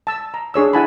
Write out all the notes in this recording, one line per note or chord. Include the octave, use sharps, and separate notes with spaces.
A5 E6
A#5
D4 G#4 C#5 E6
E4 F#5 G#5 A5 B5